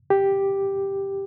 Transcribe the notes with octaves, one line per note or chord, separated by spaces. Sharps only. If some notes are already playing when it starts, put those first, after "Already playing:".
G4